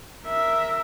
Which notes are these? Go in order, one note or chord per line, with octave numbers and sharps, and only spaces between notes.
A#4 E5